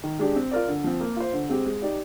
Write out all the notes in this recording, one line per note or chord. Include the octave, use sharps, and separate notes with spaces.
D#3
G#3 D4 G4
C4
F4 A#4 D5
D3
F3 C4
A#3
F4 C5
D3
G#3 C4 G4
G#3
D#4 G4 D5